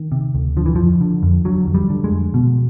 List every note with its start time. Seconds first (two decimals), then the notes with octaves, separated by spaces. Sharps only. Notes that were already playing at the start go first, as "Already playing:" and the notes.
Already playing: D#3
0.12 C3
0.35 D2
0.57 D3 F3
0.66 E3
0.76 F2 F3
1.01 D3
1.23 F2
1.45 D3 F#3
1.67 F2
1.75 G3
1.90 D3
2.04 G#3
2.12 F2
2.34 B2